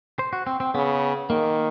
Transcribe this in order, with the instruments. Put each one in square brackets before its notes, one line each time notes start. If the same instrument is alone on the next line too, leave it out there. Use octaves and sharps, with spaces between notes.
[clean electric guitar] C5
F#4
C4
C4
[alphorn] C#3 [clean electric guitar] B3
[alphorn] D#3 [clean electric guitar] A#3